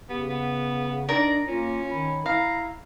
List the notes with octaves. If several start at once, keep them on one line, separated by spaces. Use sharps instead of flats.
C#3 B3 G4
B3 F#5
D4 D#4 A#4 D5 A#5
A#3 C#4 F4
D#3 B5
E4 F5 A#5